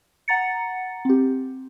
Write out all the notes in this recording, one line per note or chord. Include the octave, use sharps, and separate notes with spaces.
F#5 A#5 A6 C#7
C4 G4